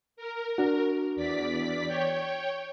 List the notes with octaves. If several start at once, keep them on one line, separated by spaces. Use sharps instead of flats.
A#4
D4 F#4
E2 D5 B6
C#5 G5